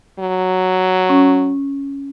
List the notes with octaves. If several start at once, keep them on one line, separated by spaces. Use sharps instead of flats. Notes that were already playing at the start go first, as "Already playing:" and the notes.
F#3
C#4